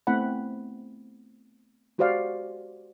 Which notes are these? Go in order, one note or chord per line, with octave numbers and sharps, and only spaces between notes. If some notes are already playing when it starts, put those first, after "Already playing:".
A3 B3 C4 E4 F#5 B5
G#3 F#4 G4 C5 D5 F5